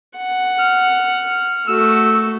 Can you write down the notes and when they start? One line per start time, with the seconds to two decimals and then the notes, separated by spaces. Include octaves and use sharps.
0.17 F#5
0.59 F6
1.68 A3 F#4 E6